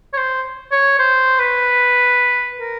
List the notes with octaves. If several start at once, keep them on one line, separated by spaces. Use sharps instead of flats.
C#5
C5
C#5
C5
B4
A#4